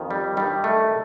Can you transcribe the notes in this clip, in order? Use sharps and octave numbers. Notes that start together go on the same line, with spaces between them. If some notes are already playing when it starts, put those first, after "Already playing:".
Already playing: F2 D#3
G3
G2 D#3 G3
A3